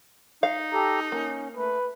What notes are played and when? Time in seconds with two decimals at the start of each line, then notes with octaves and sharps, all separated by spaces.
0.43 D#4 F5
0.73 G4 A4 A#5
1.12 A#3 C#4
1.56 A3 B4